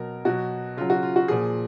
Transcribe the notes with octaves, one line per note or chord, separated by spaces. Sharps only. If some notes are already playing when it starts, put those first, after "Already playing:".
Already playing: B2 F#3 A#4
B2 F#3 F#4
C#3 F#3 F4
F#4
F4
F#4
A#2 F3 G#4